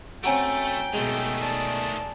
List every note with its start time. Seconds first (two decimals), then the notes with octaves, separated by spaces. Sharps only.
0.24 A3 C4 C#4 F#4 G5 G#5 A#5 D7
0.93 B1 D#3 G#3 A3
1.41 D5 A5